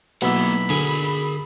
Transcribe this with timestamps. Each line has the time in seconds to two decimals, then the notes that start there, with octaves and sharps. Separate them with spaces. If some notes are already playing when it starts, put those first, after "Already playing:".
0.22 B1 A#3 E4 F#5 B5
0.70 D3 G#4 A#4 G#5